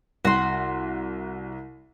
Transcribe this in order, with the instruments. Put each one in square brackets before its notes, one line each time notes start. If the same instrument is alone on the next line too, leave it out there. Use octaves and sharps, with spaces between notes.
[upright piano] C2 [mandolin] F#4 C6